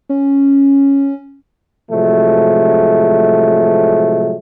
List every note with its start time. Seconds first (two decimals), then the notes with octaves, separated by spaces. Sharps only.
0.09 C#4
1.91 A2 C3 F3 F#3 G#3 A3